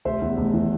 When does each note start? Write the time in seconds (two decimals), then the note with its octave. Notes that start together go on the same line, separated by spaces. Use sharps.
0.05 F1 C5 E5
0.22 E2
0.37 F1
0.54 E3